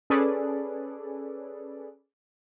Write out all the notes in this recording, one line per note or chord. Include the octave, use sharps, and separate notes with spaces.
C#4 G#4 A4 B4 D5